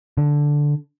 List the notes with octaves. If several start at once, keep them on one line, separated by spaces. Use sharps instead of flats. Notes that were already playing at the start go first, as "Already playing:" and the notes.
D3